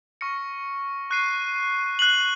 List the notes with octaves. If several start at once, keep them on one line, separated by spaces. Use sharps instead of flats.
C#6 F6 A#6 C#7
C#6 F#6 C7 D#7
F#6 C7 F#7